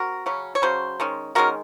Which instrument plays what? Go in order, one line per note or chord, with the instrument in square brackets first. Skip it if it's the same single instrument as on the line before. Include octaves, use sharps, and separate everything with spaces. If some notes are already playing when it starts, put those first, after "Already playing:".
Already playing: [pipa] C4 F#4 A#4
C#3 F#3 C#4
C#5
C#3 F#3 C#4 C5
D#3 G#3 C#4
D#3 G#3 C#4 F#4 A#4